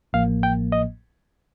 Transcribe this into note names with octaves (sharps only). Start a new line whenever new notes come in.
A1 A2 F3 A#3 F5
G5
D#5